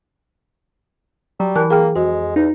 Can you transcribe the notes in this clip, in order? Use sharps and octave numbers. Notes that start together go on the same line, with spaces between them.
F#3 G3
E3 A#4 A5 F#6
A#3 G#4 G5 F6
F2 G#3 F#4
E2 D#4